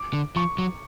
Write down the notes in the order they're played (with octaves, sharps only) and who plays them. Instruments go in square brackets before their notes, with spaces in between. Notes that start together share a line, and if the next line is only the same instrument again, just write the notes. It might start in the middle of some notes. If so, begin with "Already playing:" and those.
Already playing: [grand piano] D6
[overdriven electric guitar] D3
[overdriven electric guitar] F3 [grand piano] C#6
[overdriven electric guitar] F#3